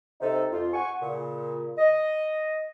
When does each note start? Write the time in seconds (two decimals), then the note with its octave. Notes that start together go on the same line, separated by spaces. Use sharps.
0.20 C3 D#4 A4
0.51 F2 F4
0.74 F#5 G#5 C#6
1.02 A#2 C#3
1.78 D#5